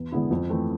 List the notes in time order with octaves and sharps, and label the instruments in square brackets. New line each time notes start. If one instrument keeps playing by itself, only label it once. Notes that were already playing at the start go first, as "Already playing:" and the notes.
Already playing: [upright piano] E2
D3 G#3 B3 E4
F2
E3 A3 C4